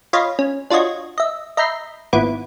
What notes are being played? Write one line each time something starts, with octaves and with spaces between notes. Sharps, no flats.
F4 C#5 D#5 F5 B5
C#4
D4 F4 F#4 C#5 D#5 G#6
D#5 E5
D#5 E5 A#5 B5 G6 C7
G#1 A#2 B3 E4 D7